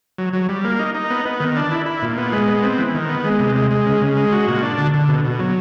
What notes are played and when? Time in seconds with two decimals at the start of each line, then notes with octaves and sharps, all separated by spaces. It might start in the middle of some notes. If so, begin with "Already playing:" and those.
0.18 F#3
0.33 F#3
0.49 G3
0.65 A#3
0.79 D#4
0.94 D#4
1.10 B3
1.25 B3
1.40 D#3
1.57 D4
1.71 E4
1.86 E4
2.02 A#2
2.18 B3
2.32 G#3
2.48 B3
2.63 C4
2.79 E3
2.95 D#3
3.09 B3
3.24 G#3
3.40 C3
3.56 G#3
3.71 G#3
3.86 C#3
4.01 C#3
4.16 G#3
4.32 F#4
4.48 A#2
4.63 D4
4.78 D3
4.94 D3
5.08 B2
5.25 B2
5.39 F#3